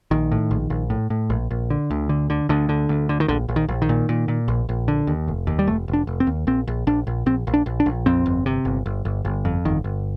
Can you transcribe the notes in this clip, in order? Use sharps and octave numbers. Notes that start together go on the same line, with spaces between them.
A#1 D#3
A2
A#1
A#1
A2
A2
A#1
A#1
D3
D2
D3
D3
D2 D3
D3
D2
D3
D#3
A#1 D3
A#1
D#3
A#1
D#3
A#2
A#2
A#2
A#1
A#1
D3
D#2
F1
D#2
G3
F1 A3
F1
D4
F1
C4
D#2
A#1 C4
A#1
A#1 D4
A#1
A#1 C4
A#1
D4
A#1
D4
A#1
F2 C4
G1
C3
G1
G1
G1
G1
F2
G1 D#3
G1